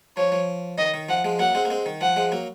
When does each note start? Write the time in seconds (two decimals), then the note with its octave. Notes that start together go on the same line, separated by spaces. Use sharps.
0.17 F3 C#5
0.32 F3
0.78 D#3 D#5
0.94 D#3
1.09 F3 F#5
1.25 F3 G#3
1.39 F#3 A#3 F#5
1.55 G#3 C4
1.65 A#3
1.70 G#3 C4
1.86 D#3
2.01 F3 F#5
2.16 F3 G#3
2.32 F#3 A#3